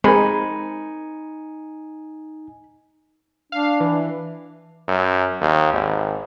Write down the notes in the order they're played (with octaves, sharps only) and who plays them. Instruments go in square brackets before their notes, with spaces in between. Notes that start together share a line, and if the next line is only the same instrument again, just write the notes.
[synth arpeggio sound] G#3 [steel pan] C4 A#4 [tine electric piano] D#4 G#5 C#7 [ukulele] B5
[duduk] D4 [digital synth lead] F5
[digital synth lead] E3
[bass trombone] F#2
D#2
G#1